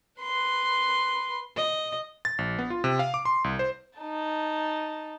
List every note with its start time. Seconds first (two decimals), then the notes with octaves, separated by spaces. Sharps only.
0.21 B4 C6
1.56 D#5
2.25 A6
2.38 A#1
2.59 B3
2.70 F4
2.84 C3
2.99 F5
3.14 D6
3.25 C6
3.44 C2
3.59 C5
3.99 D#4 A5